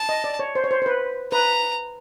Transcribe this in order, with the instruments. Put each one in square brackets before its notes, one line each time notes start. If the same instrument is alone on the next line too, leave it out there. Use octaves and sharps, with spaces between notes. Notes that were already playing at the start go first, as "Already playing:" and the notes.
Already playing: [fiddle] A5
[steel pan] D#5
D5
C#5
C5
C#5
C5
C5
B4
[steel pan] B4 [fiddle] A#5